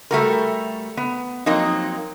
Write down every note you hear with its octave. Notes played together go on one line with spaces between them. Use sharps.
G3 A3 F#4 A#4
B3
F3 F#3 A#3 C4 D#4